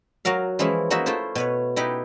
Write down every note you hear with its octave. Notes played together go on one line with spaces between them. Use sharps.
F#3 F#4 A#4 F5
E3 F3 G#3 C#4 E4
A#3 D#4 F#4 A#4 E5
A3 E4 F4 C5
B2 B4 C#5
D#4 E4 G4 B4